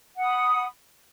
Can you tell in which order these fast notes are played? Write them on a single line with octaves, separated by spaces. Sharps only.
F#5 D#6 B5